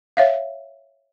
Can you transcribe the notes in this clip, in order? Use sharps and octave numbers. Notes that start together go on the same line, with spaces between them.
C#5 E5 F5